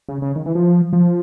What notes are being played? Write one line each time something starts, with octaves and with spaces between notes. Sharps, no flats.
C#3
C#3
D#3
E3
F3
F3